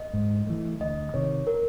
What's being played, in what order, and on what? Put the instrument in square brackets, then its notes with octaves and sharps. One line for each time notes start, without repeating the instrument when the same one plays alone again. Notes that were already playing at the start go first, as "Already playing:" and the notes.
Already playing: [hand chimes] D#5
[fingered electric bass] G#2
E3 A3
[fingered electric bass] D2 [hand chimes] D#5
[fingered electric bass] C3 D#3 [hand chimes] C#5
[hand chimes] A#4